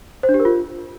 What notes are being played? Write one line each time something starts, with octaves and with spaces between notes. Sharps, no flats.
C5
D4
G4
A#4
F4